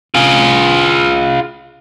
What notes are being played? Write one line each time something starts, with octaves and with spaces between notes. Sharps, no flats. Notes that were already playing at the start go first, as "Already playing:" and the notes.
F4 G#4